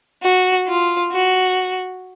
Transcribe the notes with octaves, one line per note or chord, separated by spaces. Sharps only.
F#4
F4
F#4